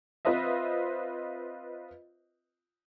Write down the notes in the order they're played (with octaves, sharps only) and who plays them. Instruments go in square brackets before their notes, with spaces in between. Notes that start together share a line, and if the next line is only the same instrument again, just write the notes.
[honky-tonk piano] C4 F4 B4 C5 D#5 E5